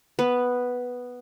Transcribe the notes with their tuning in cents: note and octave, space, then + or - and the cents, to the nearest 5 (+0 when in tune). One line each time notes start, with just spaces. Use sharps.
B3 +0 B4 +0